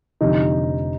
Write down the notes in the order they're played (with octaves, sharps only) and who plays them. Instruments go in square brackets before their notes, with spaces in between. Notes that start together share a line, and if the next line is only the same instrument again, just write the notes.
[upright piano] F1 F2 D3 D#4 G4